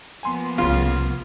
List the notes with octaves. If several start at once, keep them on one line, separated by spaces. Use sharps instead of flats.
F3 A#3 B3 G#5 C6
F#1 C2 C#3 F4